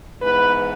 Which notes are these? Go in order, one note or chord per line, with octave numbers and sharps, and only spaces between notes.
G#2 E3 B3 B4